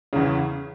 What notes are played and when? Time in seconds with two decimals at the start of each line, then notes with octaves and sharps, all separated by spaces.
0.13 C#3
0.15 E2
0.18 E3